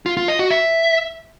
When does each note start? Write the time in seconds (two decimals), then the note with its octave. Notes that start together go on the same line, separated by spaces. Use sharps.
0.06 F4
0.17 F4
0.28 D#5
0.39 F#4
0.51 E5